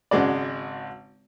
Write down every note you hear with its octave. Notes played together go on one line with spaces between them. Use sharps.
G#1 C#3 G#3 F#4 D5